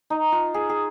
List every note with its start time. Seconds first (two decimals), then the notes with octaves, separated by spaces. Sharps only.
0.10 D#4
0.32 F4
0.54 G#4
0.69 G#4